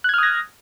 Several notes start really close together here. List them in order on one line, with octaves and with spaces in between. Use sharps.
F#6 G#6 F6 D#6 A#6